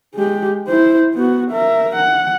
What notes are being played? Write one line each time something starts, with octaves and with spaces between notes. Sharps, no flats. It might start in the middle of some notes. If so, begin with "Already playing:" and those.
G#3 G4
E4 C5
B3 F#4
A#4 E5
F#5